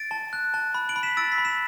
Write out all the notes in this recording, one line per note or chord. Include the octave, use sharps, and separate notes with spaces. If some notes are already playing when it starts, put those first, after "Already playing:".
Already playing: A6 D7
A5
F#6
A5
B5
D7 F#7
B5
B6 E7
E6 A6 D7
B6
B5
B6 E7